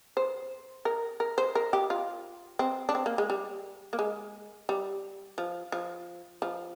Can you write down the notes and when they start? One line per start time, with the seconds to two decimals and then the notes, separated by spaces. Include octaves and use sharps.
0.17 C5
0.85 A#4
1.20 A#4
1.38 C5
1.55 A#4
1.73 G4
1.90 F4
2.59 C4
2.89 D4
2.95 C4
3.06 A#3
3.18 G#3
3.30 G3
3.93 A#3
3.99 G#3
4.69 G3
5.38 F3
5.72 F3
6.42 F3